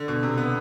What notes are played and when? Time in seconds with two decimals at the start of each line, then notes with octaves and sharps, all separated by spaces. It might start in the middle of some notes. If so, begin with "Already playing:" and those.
Already playing: D3
0.08 B2
0.23 C3
0.38 B3